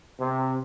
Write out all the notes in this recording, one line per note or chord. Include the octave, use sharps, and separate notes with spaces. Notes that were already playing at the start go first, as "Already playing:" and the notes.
C3